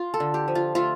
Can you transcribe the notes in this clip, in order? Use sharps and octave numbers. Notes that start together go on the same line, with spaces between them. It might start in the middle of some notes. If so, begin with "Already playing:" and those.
Already playing: F4
A4
D3
G4
F3
F4
A3 F4